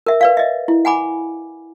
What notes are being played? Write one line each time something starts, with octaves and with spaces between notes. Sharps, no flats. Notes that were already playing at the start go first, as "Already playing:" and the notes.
A#4 E5
B4 D5 F5
D#5 E5
E4
F#5 G#5 B5 D6